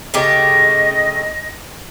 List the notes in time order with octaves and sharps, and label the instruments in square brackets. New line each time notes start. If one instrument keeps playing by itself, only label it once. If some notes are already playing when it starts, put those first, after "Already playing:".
[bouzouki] C#3 A3 G4 [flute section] D#5